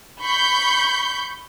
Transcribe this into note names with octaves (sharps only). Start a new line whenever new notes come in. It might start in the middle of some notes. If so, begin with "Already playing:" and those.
B5 C#6 G6